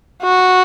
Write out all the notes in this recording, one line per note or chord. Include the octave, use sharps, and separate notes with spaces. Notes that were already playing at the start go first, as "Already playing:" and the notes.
F#4